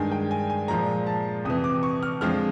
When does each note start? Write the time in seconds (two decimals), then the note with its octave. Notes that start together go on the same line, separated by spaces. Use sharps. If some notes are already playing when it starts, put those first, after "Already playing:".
Already playing: G2 D#3 G#3 G#5
0.12 G5
0.31 G#5
0.50 G#5
0.68 A#2 F3 G#3 A#5
1.07 A5
1.45 F2 C3 E3 D#6
1.64 D6
1.83 C#6
2.03 F6
2.21 F2 D3 F3 G#3 F6